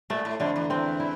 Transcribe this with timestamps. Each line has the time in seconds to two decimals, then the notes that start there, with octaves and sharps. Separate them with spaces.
0.10 A#2 A3
0.25 A2
0.40 F2 D3
0.56 E2
0.70 E2 C4
1.00 E4